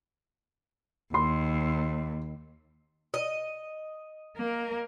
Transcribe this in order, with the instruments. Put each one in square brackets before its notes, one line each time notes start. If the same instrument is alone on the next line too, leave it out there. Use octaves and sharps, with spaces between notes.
[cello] D#2 [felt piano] C6
[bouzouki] D#5
[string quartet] A#3 A#4